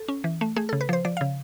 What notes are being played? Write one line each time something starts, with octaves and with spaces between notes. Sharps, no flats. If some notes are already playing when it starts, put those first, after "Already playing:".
Already playing: A4
C#4
E3
A3
A3 G#4
A4
C#3
B4
F3 C5
F3 D5
F5
C#3